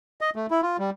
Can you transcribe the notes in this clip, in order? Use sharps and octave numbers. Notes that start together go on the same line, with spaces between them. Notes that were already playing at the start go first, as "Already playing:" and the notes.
D#5
A3
E4
F4
G3